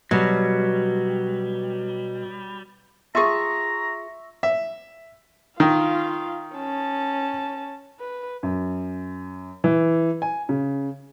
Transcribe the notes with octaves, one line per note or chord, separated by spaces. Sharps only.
B2 F#3 G3
F4 G#4 E5 A#5 C#6
E5
D#3 F4 F5
C#4 A5
B4
F#2
E3
G#5
C#3